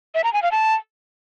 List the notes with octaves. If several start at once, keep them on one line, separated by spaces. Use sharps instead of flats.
E5
A#5
G#5
F5
A5